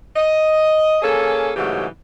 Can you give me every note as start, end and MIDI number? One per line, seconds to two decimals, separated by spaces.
0.16 0.98 75
1.03 1.51 58
1.03 1.51 61
1.03 1.51 68
1.03 1.51 69
1.56 1.85 44
1.56 1.85 49
1.56 1.85 52
1.56 1.85 54
1.56 1.85 57
1.56 1.85 67